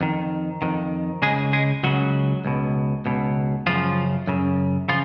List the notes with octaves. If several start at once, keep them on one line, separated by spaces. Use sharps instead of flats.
F2 D#3
F2 D#3
C#2 C#3 G#3 G#4
G#3 G#4
C#2 C#3 F#3 F#4
C#2 B2
C#2 B2
F#2 C#3 F3 F4
F#2 C#3
C#3 F3 F4